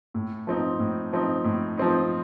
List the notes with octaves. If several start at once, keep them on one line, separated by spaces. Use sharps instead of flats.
A2
F3 C4 D#4
A2
F3 C4 D#4
A2
F3 C4 D#4